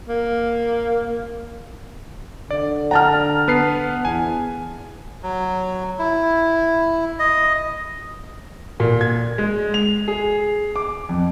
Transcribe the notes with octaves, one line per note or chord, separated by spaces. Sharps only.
A#3
D3 D5
F#5 A5 A#5 F6
B3 B4 C7
E2 G#5
F#3
E4
D#5
A#2
G#6
G#3
F7
G#4
D6
F2